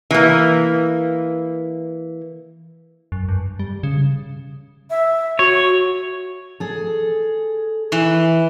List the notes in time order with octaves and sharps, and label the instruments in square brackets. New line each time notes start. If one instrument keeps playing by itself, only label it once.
[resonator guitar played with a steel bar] E3 A#3
[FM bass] F#2
G2
G3
C#3
[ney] E5
[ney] F#4 [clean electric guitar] C#5
[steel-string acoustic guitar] G#4 A4
[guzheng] E3